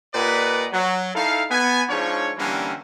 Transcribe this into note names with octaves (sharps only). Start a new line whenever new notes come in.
A#2 G4 B4 D5 D#5 F#5
F#3
D#4 E4 A4 F5
B3 G#5
G#2 F3 D4 C#5
D3 E3 G3 A#3 C4 C#4